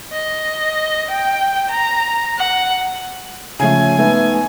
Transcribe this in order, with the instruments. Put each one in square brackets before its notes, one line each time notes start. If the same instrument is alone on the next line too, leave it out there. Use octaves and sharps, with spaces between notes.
[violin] D#5
G5
A#5
F#5
[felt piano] C#3 F3 A3 [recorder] G#5
[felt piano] A3 B3 D#4